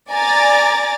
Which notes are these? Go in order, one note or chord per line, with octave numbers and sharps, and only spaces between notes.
D5 G#5 A#5 D6 A6